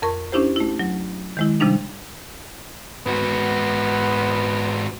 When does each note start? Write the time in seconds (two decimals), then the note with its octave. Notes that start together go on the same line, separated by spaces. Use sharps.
0.02 F2 A#4 C#6
0.32 C#4 D4 E4 G4 C5
0.56 A3 E4
0.79 F#3
1.37 D#3 G#3 E4
1.60 C3 F3 G3 D4 D#4
3.07 G#2 B3 F#4